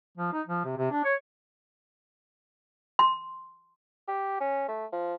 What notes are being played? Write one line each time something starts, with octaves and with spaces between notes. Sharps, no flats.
F3
D#4
F3
C3
C3
D4
C#5
C6
G4
C#4
A3
F3